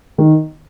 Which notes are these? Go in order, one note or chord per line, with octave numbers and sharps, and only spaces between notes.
D#3